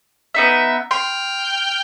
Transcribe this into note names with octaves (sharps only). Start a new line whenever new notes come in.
B3 D#4 E5
G5 C6 F6 G6